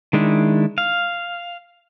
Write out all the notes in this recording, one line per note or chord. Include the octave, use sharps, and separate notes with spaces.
D#3 G#3 D4 E4
F5